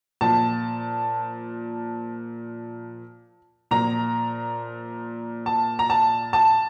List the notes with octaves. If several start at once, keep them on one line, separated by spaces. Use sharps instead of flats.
A#2 F3 A5
A#2 F3 A#5
A5
A#5
A5
A5